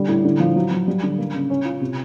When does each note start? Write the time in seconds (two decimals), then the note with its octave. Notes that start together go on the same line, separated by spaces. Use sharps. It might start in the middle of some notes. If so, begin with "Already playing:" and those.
Already playing: D3 G3
0.09 A2
0.25 D3
0.40 F3
0.56 F#3
0.71 F#3
0.88 G3
1.03 D3
1.18 A#3
1.34 C#3
1.50 C#4
1.65 F4
1.81 C3